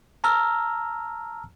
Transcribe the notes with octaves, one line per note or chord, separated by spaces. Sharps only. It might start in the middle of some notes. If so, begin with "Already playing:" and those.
A5 A#5 E6 F6